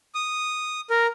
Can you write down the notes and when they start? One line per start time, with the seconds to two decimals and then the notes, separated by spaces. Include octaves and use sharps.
0.15 D#6
0.90 A#4